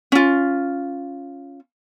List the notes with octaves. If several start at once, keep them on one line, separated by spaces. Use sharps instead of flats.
C#4 F4